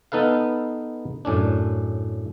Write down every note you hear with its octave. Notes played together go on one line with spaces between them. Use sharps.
B3 D#4 A4 B4 F5
F#2 A2 C#4 D4